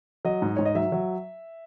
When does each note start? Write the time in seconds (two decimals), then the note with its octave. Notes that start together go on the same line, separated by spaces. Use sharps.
0.25 F#3 D#5
0.42 G#2
0.56 G#2 C#5
0.65 D#5
0.75 F#3 E5
0.92 F#3